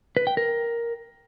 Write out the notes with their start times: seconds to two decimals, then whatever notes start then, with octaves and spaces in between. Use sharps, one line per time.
0.17 B4
0.27 G5
0.37 A#4